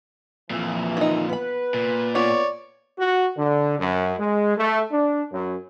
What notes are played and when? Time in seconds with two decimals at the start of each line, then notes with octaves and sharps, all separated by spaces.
0.50 F2 A#2 E3
0.97 D#3 D#4
1.29 B3 B4 B5
1.74 A#2
2.15 B3 F4 C#5 D5
2.99 F#4
3.37 D3
3.79 F#2
4.19 G#3
4.57 A3
4.92 D4
5.32 F#2